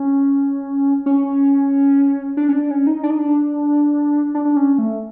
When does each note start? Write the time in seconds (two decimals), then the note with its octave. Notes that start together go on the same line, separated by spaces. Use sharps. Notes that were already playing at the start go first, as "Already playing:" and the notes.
Already playing: C#4
1.06 C#4
2.37 D4
2.49 C#4
2.53 D4
2.71 C#4
2.87 D#4
3.03 D4
3.10 D#4
3.19 D4
4.35 D4
4.45 D4
4.56 C#4
4.78 A3